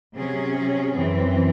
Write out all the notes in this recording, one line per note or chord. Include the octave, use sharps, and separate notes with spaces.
C3 F#3 C#4 G#4
F#2 E3 C4